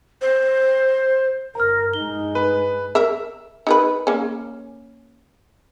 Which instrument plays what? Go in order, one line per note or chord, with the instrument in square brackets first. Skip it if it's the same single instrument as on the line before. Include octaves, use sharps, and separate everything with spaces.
[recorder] C5
[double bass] G1 [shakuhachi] A#4 [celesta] A#5 F6
[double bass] G2 G#3 [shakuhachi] D#4 [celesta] G7
[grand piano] B4
[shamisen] A#4 E5
D#4 A#4 B4
A#3 C#4